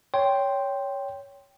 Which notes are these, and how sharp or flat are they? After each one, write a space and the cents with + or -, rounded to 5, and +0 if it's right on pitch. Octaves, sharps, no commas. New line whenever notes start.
C#5 +10 G5 +0 C6 +0